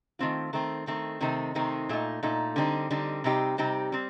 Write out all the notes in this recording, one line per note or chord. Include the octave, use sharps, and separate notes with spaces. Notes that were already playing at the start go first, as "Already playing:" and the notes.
D#3 A3 C4 F4
D#3 A3 C4
D#3 A3 C4
C3 D#3 A3 C4 D#4
C3 D#3 A3 C4 D#4
A#2 A3 D#4
A#2 A3 D#4
D3 G3 C4 D#4
D3 G3 C4 D#4
C3 G3 C4 D#4 G4
C3 G3 C4 D#4 G4
G3 C4